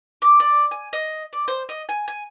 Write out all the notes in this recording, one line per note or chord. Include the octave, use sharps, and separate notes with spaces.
D6
D5
G#5
D#5
D5
C5
D#5
G#5
G#5